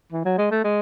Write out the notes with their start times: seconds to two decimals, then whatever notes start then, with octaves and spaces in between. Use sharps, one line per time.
0.13 E3
0.25 F#3
0.38 G#3
0.52 A3
0.64 G#3